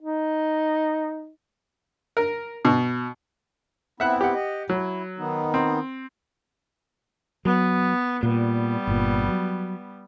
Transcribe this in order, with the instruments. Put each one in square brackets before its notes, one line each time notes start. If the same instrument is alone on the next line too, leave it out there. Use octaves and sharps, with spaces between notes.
[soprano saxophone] D#4
[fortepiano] A#4
B2
[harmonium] B3 C4 E4 [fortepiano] E5 F#5 F#6
[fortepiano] G4 F#5
[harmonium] D#5
[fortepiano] F#3 [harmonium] E4
[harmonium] D#3 B3 D#4
[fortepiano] C4
[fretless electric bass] F#3 [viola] B3
[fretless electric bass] A#2 [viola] G3 B3
[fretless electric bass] G1 A#2
F#3